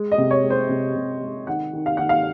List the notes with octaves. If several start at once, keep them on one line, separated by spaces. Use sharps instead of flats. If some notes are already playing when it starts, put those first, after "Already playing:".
Already playing: G#3
D#5
C3
C#5
G#3
C5
C3
C3
G#3
D#3 F#5
D#3
F5
D#3 F#5
F5